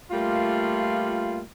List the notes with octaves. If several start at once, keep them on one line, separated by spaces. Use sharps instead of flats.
G3 A3 A#3 F4